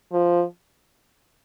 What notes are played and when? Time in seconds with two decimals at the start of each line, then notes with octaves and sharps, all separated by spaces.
0.12 F3